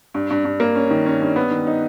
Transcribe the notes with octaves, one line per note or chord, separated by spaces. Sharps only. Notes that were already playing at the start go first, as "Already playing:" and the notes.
G2
G2
G2
A#3
C#4
D#3
C#4
G2
B3
D#3
D#4